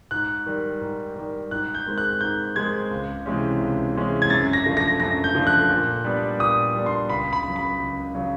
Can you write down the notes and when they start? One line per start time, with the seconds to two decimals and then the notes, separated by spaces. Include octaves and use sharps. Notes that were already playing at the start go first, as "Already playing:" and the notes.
0.11 G#2 F#6
0.46 D#3 G3
0.81 G#2
1.16 D#3 G3
1.51 G#2 F#6
1.75 G6
1.86 D#3 G#3 C4
1.98 F#6
2.21 G#2 G6
2.56 D#3 G#3 C4 G#6
2.91 C#2
3.26 C3 E3 G#3 C#4
3.61 C#2
3.95 C3 E3 G#3 C#4
4.22 G#6
4.30 F#2 A6
4.53 A#6
4.66 D3 F3 A3
4.77 A#6
5.00 F#2 A#6
5.24 G6
5.35 D3 F3 A3
5.47 F#6
5.70 A#2
6.05 G3 B3 D4
6.39 A#2 D#6
6.75 G3 B3 D4
6.86 C6
7.10 C#2 B5
7.33 B5
7.44 C#3 F#3
7.56 B5
7.80 C#2
8.15 C#3 F#3